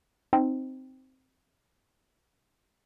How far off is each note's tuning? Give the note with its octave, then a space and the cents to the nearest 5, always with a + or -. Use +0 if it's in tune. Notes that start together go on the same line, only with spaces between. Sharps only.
C4 +0 D#4 +0